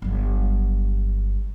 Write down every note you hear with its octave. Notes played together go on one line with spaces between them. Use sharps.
G1 F#3